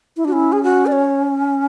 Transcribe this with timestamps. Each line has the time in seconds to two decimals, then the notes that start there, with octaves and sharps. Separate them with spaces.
0.17 E4
0.25 D4 F#4
0.32 C#4 E4
0.52 G#4
0.63 F#4
0.86 D5
0.92 C#5